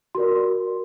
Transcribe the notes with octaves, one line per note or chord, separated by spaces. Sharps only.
F#4 A#4 D5 C6